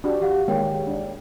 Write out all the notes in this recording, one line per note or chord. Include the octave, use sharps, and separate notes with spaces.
D4 F#4 G4
E3 G4 F5 F#5
D#3 G#3 A#3 C#5 G5
D4